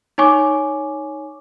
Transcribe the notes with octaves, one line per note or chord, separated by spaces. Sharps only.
D#4 C#5 G#5 C#6 D6